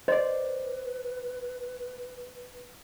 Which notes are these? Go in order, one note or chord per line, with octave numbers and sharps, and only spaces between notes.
B4 C5 D5 D#5